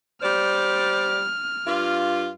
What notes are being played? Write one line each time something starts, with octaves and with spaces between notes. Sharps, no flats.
G3 C5 D5 F6
G2 F4